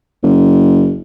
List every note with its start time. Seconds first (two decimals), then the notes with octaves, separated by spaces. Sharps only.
0.23 F#1